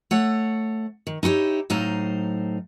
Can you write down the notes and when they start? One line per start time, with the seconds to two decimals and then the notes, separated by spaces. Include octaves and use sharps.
0.11 A3 C#5 F#5
1.07 D#3
1.23 D#4 E4 F#4 G4 C#5
1.70 A2 F#3 D#4 C5 F5